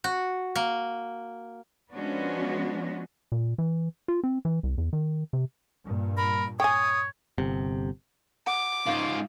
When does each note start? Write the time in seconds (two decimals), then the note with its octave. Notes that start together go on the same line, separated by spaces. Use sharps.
0.04 F#4
0.56 A#3
1.93 F3 G#3 B3 C#4 D4 F#4
3.32 A#2
3.58 E3
4.08 F4
4.24 C4
4.45 E3
4.63 C2
4.78 E2
4.93 D#3
5.33 C3
5.84 G2 A#2
6.17 A#4 B5
6.60 C#5 G5 G#5 D#6
7.38 G1 C3
8.47 F#5 D6
8.87 G#2 C#4 D#4 F4 F5